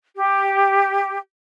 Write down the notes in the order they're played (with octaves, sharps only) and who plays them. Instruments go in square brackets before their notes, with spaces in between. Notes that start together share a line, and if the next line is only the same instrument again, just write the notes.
[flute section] G4